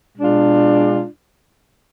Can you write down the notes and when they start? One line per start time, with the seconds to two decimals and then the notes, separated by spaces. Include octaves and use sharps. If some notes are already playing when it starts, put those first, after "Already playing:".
0.17 B2 G#3 D4 F4